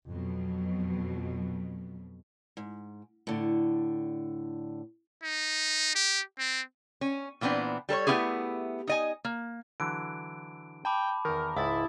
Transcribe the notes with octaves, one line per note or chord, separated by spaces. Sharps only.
F2 B2 F#3
G#2
A2 D3
D#4
G4
C4
C#4
A#2 E3 B3 C4 D4
G3 A4 A#4 C#5
A3 B3 C#4 E4 G4 G#4
D#4 D#5 G#5
A#3
D3 E3 F#3 D7
G5 A5 B5 D6
E2 D#3 A#4
C#2 G#2 E4 D#6 A6